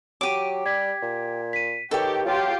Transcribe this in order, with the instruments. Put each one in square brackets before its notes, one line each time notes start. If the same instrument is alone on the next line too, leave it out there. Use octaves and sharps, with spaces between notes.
[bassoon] F#3 [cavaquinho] G4 D6 [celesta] D7 D#7
[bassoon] G3 [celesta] G#6 B6
[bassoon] A#2
[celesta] B6 D#7
[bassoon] D#3 [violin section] G4 [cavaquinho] A4 C#5 [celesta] B4
[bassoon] F#3 [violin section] F4 G4